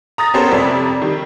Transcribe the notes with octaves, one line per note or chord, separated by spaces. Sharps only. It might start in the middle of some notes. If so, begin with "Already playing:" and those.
A#5 D#6 A6 A#6
B3 C#4 G4 A4 A#4 C5
F2 C3 D5 B6
D#3 G3